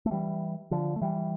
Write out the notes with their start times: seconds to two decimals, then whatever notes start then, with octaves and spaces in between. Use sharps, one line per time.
0.06 A3
0.11 E3 G3
0.71 D3 F3
0.96 A3
1.02 E3 G3